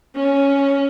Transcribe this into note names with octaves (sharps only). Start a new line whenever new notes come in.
C#4